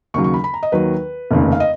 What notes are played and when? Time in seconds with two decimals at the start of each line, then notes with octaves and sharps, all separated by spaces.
0.14 D#2 C#3 F#3 C#6
0.24 C#6
0.34 B5
0.44 B5
0.54 A#5
0.63 D#5
0.72 D#2 D#3 F#3 B4
1.31 F1 D#2 C#3
1.52 F5
1.60 D#5